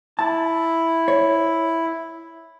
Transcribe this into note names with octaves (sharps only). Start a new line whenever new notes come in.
E4 A5
C#5